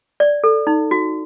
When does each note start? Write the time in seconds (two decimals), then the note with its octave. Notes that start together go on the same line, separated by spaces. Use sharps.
0.20 D5
0.44 A4
0.67 D#4
0.91 F#4